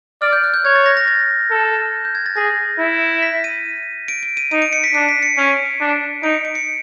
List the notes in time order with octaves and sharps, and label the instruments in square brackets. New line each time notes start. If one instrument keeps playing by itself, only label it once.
[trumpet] D5 [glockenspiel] F6
[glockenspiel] G6
F#6
G6
[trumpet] C#5 [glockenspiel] G#6
[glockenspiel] A6
A#6
A#6
A6
[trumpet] A4
[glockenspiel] G6
G#6
A6
[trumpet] G#4 [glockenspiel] A#6
[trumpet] E4
[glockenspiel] B6
D#7
D7
D7
D#7
[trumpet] D#4 [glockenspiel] D#7
[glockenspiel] D7
C#7
B6
[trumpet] D4 [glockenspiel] C7
[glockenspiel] B6
C#7
[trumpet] C#4 [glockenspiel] D7
[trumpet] D4
[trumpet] D#4 [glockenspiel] D7
[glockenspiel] C#7
D7
C#7